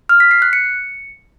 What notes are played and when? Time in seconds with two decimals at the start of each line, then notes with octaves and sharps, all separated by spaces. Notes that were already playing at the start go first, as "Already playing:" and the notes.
0.09 F6
0.20 B6
0.31 C7
0.42 F#6
0.53 C#7